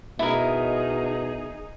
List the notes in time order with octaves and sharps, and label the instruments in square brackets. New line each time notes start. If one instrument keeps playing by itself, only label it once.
[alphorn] B2 [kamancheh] D#4 G#4 [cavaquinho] E4 A#4